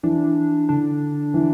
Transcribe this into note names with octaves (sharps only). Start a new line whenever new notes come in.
E3 D4
D3 D4
E3